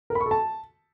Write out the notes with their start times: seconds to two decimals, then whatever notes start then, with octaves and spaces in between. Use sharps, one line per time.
0.10 A#4
0.15 B5
0.21 C#6
0.26 A4
0.31 A5